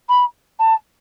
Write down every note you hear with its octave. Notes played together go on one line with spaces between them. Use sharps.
B5
A5